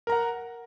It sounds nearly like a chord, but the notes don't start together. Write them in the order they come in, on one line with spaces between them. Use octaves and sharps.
A#4 A#5 F#5